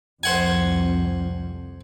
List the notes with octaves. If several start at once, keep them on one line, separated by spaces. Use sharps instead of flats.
C2 F2 C5 F#5 G#5